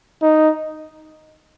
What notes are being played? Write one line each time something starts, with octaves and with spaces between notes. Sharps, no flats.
D#4